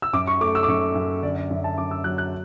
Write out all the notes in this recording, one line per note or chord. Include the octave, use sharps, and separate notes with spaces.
E6
F#2 D6
C#6
A3 D6
E6
D6
F#2 C#6
F#2
D3 D5
D5
F#2 E5
A5
F#2 D6
E6
F#3 F#6
F#6